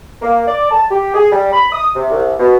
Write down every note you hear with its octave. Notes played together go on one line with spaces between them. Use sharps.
A#3
D5
A5
G4
G#4
G3
B5
D#6
C3
C2
B2